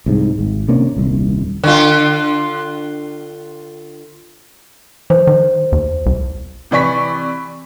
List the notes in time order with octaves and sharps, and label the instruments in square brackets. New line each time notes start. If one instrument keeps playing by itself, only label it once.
[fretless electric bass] C2 G#2
G#1
C3 A#3 C#4 D4
D#1 C2
[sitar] D3 F4
[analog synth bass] E3 [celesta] C5
[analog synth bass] D#3
D#2
C2
[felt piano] C3 E3 D5 C#6 B6